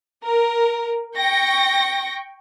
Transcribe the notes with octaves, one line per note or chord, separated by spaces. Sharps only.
A#4
G5 C#6 A#6